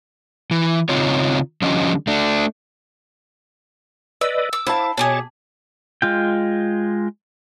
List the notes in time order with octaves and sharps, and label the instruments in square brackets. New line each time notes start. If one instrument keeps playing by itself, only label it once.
[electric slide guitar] E3
C#3 C4 D#4 F4 C#5
D3 F3 G3 C#4 D#5
A3 D4
[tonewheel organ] B4 D5 D#5 [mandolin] E6
[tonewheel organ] D6 [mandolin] E6
[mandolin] E4 [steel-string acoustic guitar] C5 F5 A5
[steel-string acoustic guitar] B2 [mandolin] D4 G4 G#4 [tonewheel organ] C#5 A5
[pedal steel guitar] G#3 F4 G5